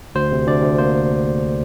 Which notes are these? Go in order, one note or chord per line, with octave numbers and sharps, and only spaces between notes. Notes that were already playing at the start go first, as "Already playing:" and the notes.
D2 C5
C3
D2 D5
D2
A#3 C5